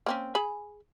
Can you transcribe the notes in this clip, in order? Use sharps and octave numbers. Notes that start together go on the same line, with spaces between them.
A#3 C4 C#4
G#4 G#5 B5